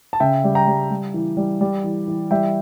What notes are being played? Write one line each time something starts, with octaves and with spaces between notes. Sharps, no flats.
A5
C#3 E5 G5
G3
G5 A#5
G3
G3
E3
G3
G3
E3
E3
G3 E5 G5